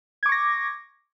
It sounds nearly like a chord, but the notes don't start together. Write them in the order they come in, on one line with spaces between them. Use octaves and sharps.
G#6 D6 C#6 A#6